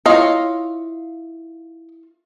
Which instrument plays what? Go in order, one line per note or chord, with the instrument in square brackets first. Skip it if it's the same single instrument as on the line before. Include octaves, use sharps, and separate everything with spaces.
[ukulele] E4 F4 [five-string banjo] C#5 D#5 F5